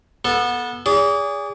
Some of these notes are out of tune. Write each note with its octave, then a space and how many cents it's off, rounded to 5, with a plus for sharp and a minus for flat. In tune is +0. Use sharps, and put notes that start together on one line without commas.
B3 -25 A4 -10
G#4 -20 D5 -40